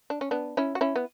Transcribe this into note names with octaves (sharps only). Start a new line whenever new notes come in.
D4
C#4
B3 D4
C#4 E4
F#4
C#4 E4
B3